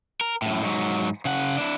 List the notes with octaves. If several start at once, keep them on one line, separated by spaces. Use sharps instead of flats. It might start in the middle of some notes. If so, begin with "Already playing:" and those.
A#4
F#2 A2
G#2 F#3
C#3 F#5
D4 E4